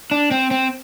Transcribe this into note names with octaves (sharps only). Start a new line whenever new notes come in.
D4
C4
C4